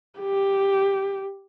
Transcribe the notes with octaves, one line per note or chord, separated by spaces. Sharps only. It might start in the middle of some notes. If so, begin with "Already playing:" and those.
G4